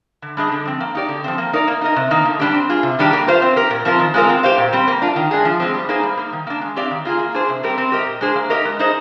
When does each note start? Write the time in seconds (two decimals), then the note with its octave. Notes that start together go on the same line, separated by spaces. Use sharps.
0.22 D3
0.37 G3 D4 G#4 D#5
0.52 D3
0.65 F3 C4
0.80 A#3
0.95 D#4 G4 D5
1.09 D3
1.24 F3 C4
1.38 A#3
1.53 D#4 A#4 D5
1.68 A#3
1.81 D#4 A#4 D#5
1.96 C3
2.11 D#3 A#3 D#4
2.25 D3
2.40 G3 A#3 D4 G4
2.54 C4
2.69 F4 G#4
2.83 C3
2.99 D#3 G3 D4 G4
3.13 A#3
3.28 F4 C5 F5
3.42 C4
3.56 G4 A#4
3.70 A#2
3.85 F3 C4 F4 A#4
3.99 D#3
4.14 G#3 C4 F4 A#4
4.29 C4
4.43 G4 C5 F5
4.58 A#2
4.73 G3 C4
4.88 A#3
5.02 D4 F4
5.16 D#3
5.31 G#3 D4 G#4
5.45 F3
5.60 G#3 C4
5.74 G3
5.89 A#3 D#4 G#4 C5
6.03 G3
6.17 A#3 D#4
6.33 D#3
6.47 A#3 D4
6.61 G#3
6.76 C4 G4 D5 F5
6.91 D#3
7.05 A#3 F4 G#4
7.19 A#3
7.34 D4 G#4 C5
7.49 C3
7.63 G3 C4 G4 A#4
7.78 C4
7.92 G4 A#4 D#5
8.06 A#2
8.21 G#3 D4 G#4 C5
8.35 A#3
8.50 D#4 G4 A#4 D#5
8.65 G#3
8.79 D#4 G#4 C5 D#5